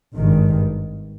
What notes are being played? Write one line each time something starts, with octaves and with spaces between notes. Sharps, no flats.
G#1 G2 D#3